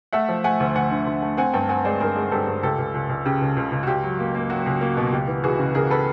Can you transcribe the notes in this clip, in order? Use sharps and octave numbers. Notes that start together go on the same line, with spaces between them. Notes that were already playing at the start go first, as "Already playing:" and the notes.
A3 E5 F#5
F3
A3 F#5 G#5
D2
D2 F#5 G#5
D3
D2
A3
C4 F#5 G#5
G2 G5 A5
C4 F#5 G#5
G#3 C5 D5
G2 G#4 A#4
G#3
G2 G4 A4
G2
C#2 G4 A4
C#2
C#2
C#2
C#3 G4
C#2
C#2
C#2
F#4
C#2 G4
F#3
A#3
A#3
F#3 F#4
C#2
A#3
B2
C#2 G4
E3
E3 F#4 G#4
C#3
C#3 G#4 A#4
A4 B4